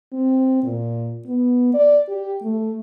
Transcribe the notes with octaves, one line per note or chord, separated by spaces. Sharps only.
C4
A#2
B3
D5
G4
A3